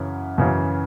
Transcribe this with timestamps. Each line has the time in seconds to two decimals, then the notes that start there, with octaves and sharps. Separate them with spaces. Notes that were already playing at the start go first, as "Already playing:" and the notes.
Already playing: F#2 C#3 E3
0.38 F#2 C#3 E3